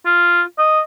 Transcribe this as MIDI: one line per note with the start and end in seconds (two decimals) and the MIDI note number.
0.06 0.42 65
0.58 0.81 75